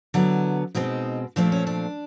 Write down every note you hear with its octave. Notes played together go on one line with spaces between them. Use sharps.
D3 F#3 B3 E4
B2 G#3 C4 D#4
A#2 F3 A3 C4 D4
C#4
D4